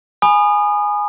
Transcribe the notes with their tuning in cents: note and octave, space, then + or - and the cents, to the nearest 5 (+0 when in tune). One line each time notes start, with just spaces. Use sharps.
G#5 +0 B5 +0 D#6 -25